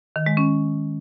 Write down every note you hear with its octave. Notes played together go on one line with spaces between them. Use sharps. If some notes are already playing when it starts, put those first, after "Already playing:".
D#3
G#3
C#4